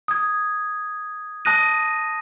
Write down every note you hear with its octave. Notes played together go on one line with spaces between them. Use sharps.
D#6 G#6
A5 D#6 F#6 A#6 D#7